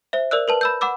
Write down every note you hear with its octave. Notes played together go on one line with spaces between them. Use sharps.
C5 E5
A#4 D5 E6 F#6
A#4 B4 A5
B5 E6 G6
F#5 B5 D6 E6